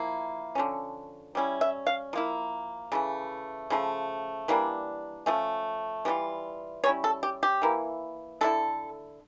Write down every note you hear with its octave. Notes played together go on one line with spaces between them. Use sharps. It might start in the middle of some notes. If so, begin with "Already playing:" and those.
Already playing: F3 A#3 E4
D3 F3 C#4
G3 C#4 E4
E5
F5
F3 A#3 E4
C#3 E3 A3
C#3 F3 A3
E3 G3 A#3 D4
F3 A3 C#4
E3 G3 D4 F4
G3 C#4 E4 C#5
A4
G4
G4
E3 A#3 E4
D3 A3 E4 A4